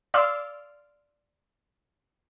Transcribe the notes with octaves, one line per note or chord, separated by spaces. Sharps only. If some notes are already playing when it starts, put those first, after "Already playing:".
D5 F5 C6 D6 E6 F6